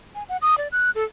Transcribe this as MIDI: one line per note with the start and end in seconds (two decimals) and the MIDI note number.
0.15 0.23 80
0.29 0.37 78
0.42 0.55 87
0.58 0.68 74
0.72 0.91 90
0.95 1.04 69